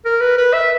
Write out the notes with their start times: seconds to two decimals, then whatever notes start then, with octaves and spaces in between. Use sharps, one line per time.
0.05 A#4
0.21 B4
0.37 B4
0.53 E5